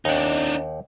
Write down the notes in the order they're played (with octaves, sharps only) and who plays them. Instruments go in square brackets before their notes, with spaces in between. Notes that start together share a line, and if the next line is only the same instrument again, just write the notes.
[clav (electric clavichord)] D#2 F#5 G5 [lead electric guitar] D4 D#4